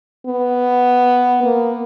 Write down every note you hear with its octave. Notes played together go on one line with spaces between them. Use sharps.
B3
A#3